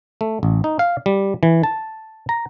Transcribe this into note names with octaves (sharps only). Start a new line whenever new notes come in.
A3
A1
D#4
F5
G3
E3
A5
A#5